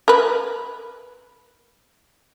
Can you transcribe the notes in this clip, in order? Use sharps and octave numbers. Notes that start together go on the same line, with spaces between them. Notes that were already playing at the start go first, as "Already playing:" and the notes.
A#4 B4